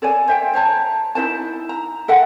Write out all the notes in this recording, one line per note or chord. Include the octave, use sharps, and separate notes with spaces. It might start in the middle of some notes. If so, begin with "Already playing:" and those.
A4 C#5 D5 G#5
C5 E5 G5
C5 C#5 A5 A#5
D#4 E4 C5 A5
A#5
A4 E5 F#5 G5